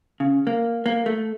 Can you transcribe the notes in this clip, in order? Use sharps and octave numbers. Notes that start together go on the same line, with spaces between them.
C#3
A#3
A#3
A3